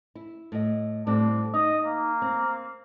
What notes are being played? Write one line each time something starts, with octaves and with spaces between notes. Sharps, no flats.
E4
A2 D#5
A2 G3 C4 D4
D#4 D#5
A#3
C4